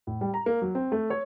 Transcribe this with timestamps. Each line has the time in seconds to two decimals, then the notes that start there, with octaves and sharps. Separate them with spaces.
0.07 A2
0.21 G3
0.34 A#5
0.46 A#3
0.62 F#3
0.75 C4
0.92 A3
1.10 C#5